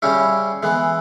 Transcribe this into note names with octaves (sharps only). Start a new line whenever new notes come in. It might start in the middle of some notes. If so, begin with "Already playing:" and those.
C#3 G3 C#4 E4
E3 G#3 B3